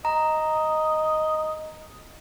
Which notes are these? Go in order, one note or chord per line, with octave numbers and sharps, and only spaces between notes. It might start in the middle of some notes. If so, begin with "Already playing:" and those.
D#5 A#5